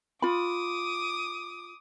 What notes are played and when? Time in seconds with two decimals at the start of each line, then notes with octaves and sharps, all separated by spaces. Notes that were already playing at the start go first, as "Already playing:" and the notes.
0.22 F4 B5 D6 D#6